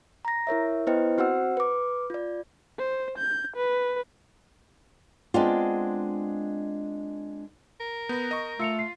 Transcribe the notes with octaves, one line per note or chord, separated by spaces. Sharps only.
A#5 A#6
E4 A#4 C#5 E5
B3 E4 B4 C5 D#5 G5
C4 F#4 C5 F#5 E6
B4 D6
F4 D5
C5
G6
B4
G#3 B3 C4 D4 F4
A#4
B3 B4 G6 A#6
D#5 C#6
A3 F4 E6 C#7 F7
C7